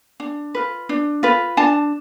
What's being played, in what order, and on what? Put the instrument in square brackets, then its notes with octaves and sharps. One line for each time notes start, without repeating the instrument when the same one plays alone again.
[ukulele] D4
F4 B4
D4
F4 B4
D4 A5